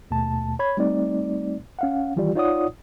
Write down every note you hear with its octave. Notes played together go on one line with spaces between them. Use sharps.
D#2 B2 A3 A5
C#5 B5 G#6
G3 A3 C4 D#4 D5
C#4 F5 F#5
D#3 E3 G3 F4 G4 D5
D#4 F4 C#5 D5 F#5 D#6